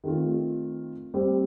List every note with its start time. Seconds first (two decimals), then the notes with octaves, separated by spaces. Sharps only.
0.04 D#3 A3 C4 F4
1.14 G3 C4 G4 C5